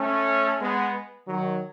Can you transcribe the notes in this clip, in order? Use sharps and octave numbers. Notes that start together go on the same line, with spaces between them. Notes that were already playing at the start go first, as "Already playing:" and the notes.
Already playing: A3 C#4
G#3 B3
D#3 F#3